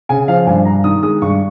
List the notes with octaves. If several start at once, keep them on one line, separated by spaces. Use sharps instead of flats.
C#3 G#5
F3 F5
G2 G#5
G2 A#5
D#3 D#6
G#3 D#6
G2 C#6